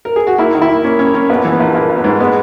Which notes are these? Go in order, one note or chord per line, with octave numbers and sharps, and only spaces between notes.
A#4
G#4
F#4
A#3 E4
D#3
E4
A#3
A#3 C#4
A#3 C#4
A#3 C#4
A#1 B3
E3
B3
A#1
A#1 A#3
A#1
B3
G#2
G#3 B3